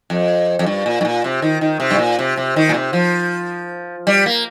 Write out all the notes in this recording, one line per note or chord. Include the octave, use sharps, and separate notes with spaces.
F2
F2
G2
A#2
G2
A#2
C3
D#3
D#3
C3
G2
A#2
C3
C3
D#3
A#2
C3
F3
G3
A#3